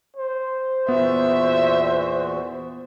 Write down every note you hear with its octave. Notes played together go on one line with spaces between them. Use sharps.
C5
E2 A#2 B3 F#4 E5